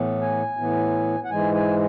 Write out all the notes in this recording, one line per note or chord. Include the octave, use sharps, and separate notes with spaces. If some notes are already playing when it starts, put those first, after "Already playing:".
Already playing: A2 E3 B3
G#5
A2 E3 B3
F#5
G#2 E3 G#3 G#5
G#5